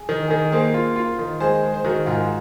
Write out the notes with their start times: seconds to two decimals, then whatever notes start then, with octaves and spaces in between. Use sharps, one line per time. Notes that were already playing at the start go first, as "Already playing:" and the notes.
Already playing: G#4
0.09 D#3
0.27 D#3 G#4
0.40 A#4
0.52 A#3 G#4 C5
0.74 F4
0.96 F4
1.19 D#3
1.40 G#3 G#4 C5
1.63 G#3
1.74 C5
1.84 D#3 F#4 A#4
2.06 G#2 F4 G#4